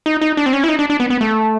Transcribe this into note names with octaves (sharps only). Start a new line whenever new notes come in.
D#4
D#4
D4
C4
C#4
E4
D#4
D4
D4
B3
B3
A3